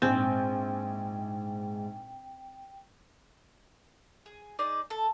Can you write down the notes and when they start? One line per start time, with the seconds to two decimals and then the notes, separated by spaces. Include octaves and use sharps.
0.02 A#1 G#2 C4 G5 G#5 G6
4.26 G#4
4.59 D#4 G#4 D5 D#6
4.90 A4